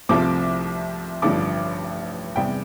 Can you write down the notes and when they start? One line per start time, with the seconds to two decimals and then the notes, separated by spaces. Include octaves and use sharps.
0.09 C2 C3 F3 A3 C4 D6
1.22 A1 G2 D3 F3 D6
2.36 E2 C3 G3 G5